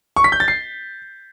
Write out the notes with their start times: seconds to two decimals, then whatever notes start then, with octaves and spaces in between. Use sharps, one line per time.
0.16 C#6
0.24 B6
0.32 G6
0.40 A6
0.48 C7